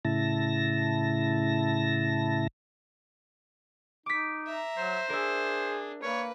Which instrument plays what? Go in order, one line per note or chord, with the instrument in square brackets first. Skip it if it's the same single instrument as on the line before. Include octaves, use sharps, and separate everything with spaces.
[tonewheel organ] A2 C#3 E4 A5 A#6
[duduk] D#4 [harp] D6 B6
[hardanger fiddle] E5 A#5
[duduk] F#3 [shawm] C5
[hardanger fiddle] D4 [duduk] G#4 [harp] A#4 E5
[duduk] A#3 [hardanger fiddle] B4 [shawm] C#5